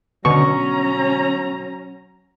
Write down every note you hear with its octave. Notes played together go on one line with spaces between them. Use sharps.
B2 D3 F#3 C#4 A#5 C#6